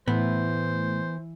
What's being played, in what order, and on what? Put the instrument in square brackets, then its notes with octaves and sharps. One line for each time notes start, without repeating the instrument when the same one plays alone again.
[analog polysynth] A2 [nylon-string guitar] E3 [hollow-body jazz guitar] B3 [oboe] C5